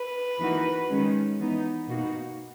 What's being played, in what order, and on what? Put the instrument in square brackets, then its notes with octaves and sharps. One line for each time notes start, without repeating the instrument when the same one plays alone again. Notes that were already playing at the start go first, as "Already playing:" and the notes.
Already playing: [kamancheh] B4
[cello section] E3 A#3 D#4 F#4
D#3 G#3 C#4
E3 B3 D#4
B2 A#3 D#4 F#4